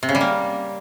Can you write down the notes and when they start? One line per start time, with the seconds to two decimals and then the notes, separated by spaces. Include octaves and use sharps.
0.03 C3
0.09 C#3
0.15 G3
0.21 A#3